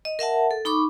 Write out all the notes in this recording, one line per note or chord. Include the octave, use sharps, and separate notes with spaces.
D#5
A#4 E5 F#5 A5
A4
D#4 B5 C#6 D6